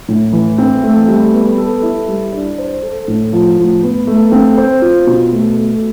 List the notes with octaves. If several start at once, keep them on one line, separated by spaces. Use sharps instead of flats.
A2
E3
C4
A3
G3
B3
A4
E4
G3
D4
C5
A4
A2
F3
A2
B3
A3
C4
C5
F4
B2
A3
A4